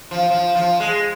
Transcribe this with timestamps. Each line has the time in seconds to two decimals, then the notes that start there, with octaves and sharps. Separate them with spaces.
0.11 F3
0.30 F3
0.55 F3
0.80 G#3